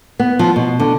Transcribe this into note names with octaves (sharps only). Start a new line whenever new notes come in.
B3
F3
B2
D3